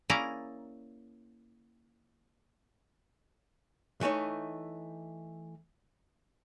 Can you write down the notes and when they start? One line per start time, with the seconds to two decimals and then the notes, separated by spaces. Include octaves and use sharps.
0.10 A#3 C#4 E4 G#4 D5 A#5
4.01 E3 A3 D#4 C#5